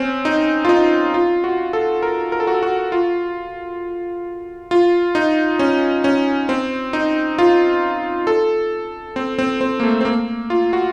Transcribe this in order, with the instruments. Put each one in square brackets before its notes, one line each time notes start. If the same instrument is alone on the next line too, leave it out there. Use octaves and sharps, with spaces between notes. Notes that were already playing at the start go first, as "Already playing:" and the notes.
Already playing: [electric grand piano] C4 C#4
D#4
F4
D#4
F4
F#4
A4
A#4
A#4
A4
F#4
A4
F#4
F4
F4
D#4
C#4
C#4
C4
D#4
F4
A4
C4
C4
C4
A#3
A3
C4
A#3
F4
F#4